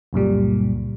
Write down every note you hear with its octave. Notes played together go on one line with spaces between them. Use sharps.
C#2 F#2 A#2 G3